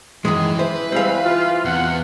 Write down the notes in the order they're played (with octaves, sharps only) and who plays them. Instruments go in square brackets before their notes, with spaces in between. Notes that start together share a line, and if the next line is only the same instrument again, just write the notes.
[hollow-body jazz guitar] F#2 D#3 G#3 [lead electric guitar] E3
[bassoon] E3 [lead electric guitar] B4 [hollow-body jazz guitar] C5
[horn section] G3 G#3 C4 [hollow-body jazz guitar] C5 F5
[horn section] F4
[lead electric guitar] E2 [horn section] C3 F#5